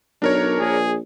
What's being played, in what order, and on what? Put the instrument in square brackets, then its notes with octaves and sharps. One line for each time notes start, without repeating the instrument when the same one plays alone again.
[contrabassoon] B1 [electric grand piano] D4 A#4 C#5
[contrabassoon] A#1 [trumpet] G#4